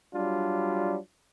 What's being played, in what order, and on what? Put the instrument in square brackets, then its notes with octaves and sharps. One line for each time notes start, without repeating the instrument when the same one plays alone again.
[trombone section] F#3 G3 D4 F4